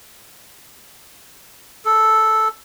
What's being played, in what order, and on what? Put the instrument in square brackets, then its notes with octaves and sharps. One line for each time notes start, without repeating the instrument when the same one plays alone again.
[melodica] A4